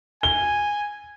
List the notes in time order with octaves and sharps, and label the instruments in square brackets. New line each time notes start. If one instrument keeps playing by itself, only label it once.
[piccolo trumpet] G#5 [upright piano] G7